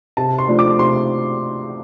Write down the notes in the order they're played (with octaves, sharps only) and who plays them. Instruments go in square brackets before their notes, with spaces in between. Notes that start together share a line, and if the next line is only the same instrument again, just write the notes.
[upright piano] C3 A5
C6
F3 A3 D4
D6
C3 C6